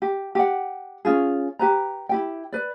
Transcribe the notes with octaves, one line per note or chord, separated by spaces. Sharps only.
G4
G4 F#5
C#4 D4 F4 G#4
G4 B4 A#5
E4 G4 G5
B4 D5